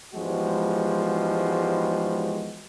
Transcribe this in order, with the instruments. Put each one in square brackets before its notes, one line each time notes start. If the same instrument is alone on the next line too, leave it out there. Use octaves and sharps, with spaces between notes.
[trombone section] E2 G#2 F3 G3 G#3 F#4